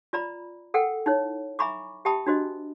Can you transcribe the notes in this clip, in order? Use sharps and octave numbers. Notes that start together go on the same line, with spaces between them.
F4 D5 A#5 B5
A4 A#4 F#5 G5
D#4 E4 C#5
E5 G#5 A#5 B5 C#6 D6
G4 E5 G5 A5 B5 D#6
D4 F#4 C5 D#5